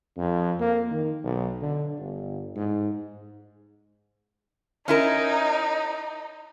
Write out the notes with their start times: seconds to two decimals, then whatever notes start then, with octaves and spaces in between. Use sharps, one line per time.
0.17 F2
0.60 A#3
0.91 D#3
1.24 B1
1.62 D3
1.98 G1
2.56 G#2
4.88 C#4 D#4 E4 A#4